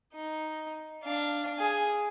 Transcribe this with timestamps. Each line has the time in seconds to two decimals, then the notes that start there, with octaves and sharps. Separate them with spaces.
0.14 D#4
1.04 D4 F5
1.60 G#4